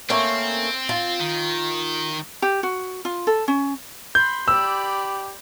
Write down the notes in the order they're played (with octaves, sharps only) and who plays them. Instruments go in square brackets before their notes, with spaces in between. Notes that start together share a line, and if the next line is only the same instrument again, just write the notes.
[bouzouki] A3 A#3 C#4 [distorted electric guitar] C4
[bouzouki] F4
[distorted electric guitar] D#3
[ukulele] G4
F#4
F4
A4
C#4
[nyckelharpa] B5 C6 [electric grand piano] G6
[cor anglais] G4 [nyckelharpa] D5 B5 [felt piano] E6